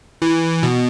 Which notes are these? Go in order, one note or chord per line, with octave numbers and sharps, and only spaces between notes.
E3
B2